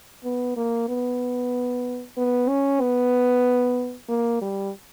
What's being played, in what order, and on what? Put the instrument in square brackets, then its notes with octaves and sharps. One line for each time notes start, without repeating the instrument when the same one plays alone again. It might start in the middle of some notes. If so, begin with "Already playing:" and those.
[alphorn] B3
A#3
B3
B3
C#4
B3
A#3
G3